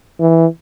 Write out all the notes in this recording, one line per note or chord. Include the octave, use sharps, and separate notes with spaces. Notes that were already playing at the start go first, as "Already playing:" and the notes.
E3